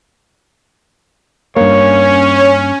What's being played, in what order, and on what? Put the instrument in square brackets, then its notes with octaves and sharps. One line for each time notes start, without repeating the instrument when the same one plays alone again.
[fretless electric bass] G2 A#3 [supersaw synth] C#4 [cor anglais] C#5